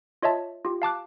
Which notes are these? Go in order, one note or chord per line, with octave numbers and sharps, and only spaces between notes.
F4 C#5 D#5 E5 A5
F4 G4
F5 A5 D6 F#6